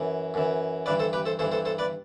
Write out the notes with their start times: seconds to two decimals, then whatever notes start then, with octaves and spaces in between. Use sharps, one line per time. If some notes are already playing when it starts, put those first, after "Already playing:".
Already playing: F#2 E3
0.34 F#2 E3
0.86 G2 E3 B4 D5
0.99 A4 C5
1.13 G4 B4
1.25 A4 C5
1.39 G2 E3 A4 C5
1.52 A4 C5
1.65 A4 C5
1.78 B4 D5